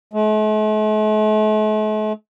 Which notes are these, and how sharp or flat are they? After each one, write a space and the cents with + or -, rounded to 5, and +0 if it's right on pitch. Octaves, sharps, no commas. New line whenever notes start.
A3 -45